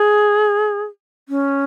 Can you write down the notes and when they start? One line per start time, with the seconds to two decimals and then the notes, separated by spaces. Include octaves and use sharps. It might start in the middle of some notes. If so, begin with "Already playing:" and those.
Already playing: G#4
1.29 C#4